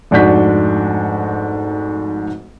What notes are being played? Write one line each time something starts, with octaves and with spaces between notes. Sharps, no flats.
F1 G#2 D4 F#4 G6 B6